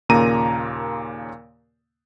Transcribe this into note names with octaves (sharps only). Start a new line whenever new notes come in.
D#2 A#2 C#3 A#3 A#5 D#7